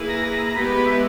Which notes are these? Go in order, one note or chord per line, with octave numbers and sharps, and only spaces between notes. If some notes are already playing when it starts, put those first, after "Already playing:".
Already playing: A#3 E4 G#4 B4
A#5
A#5
A#5
G#3 B3 G4 B4 B5
E5